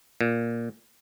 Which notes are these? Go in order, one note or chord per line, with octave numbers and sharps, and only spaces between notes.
A#2